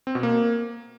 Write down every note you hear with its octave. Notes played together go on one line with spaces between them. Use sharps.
C4
B2
A#3